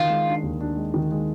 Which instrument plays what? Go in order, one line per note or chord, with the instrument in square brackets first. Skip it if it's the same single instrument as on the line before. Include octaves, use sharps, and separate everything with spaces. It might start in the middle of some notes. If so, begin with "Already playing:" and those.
Already playing: [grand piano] D#3 [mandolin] F4
[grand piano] G#3
D4
D#2
D4
G#3
D#3
G#3